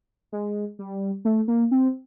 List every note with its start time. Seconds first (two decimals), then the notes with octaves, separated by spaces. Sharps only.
0.32 G#3
0.79 G3
1.25 A3
1.48 A#3
1.71 C4